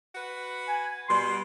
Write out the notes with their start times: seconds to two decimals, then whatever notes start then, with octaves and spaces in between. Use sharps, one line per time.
0.15 F#4 B4
0.68 G#5
1.08 B2 G3 C6